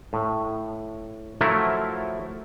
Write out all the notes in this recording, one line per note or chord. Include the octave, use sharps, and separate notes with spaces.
A2
F3 F#3 A3 E4 A#4